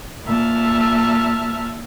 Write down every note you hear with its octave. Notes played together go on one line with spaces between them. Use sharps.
A#2 E5 A5 F6